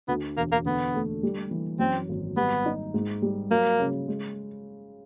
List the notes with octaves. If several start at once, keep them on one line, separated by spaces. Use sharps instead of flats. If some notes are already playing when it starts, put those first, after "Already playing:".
D2 B3
E1 A#3
A#3
D3 B3
A3
G3
E3
F#2 C4
G#1
G3 B3
D#4
G#2
G3
F#3 A#3
C#3
G#3